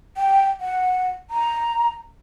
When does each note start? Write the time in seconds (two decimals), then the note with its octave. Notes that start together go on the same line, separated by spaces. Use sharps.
0.17 G5
0.61 F#5
1.30 A#5